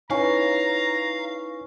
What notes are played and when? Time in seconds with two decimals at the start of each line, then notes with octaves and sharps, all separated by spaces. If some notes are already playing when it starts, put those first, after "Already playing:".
0.10 C#4 D#4 E4 B4 F5 A#5